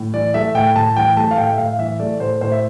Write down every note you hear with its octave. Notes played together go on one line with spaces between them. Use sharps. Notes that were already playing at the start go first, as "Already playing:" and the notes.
Already playing: A2
E3 D5
A3 E5
A2 G5
A2 A5
E3 G5
A3 A5
F5
A2 G5
E5
A2 F5
E3 E5
A3 D5
A2 C5
A2 C5
E5